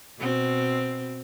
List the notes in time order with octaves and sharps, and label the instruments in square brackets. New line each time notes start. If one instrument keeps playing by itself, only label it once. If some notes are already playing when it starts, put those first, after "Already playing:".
[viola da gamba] B2 C4